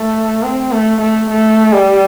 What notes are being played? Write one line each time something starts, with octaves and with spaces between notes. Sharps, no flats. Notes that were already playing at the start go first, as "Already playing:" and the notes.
Already playing: A3
C4
A3
A3
A3
G3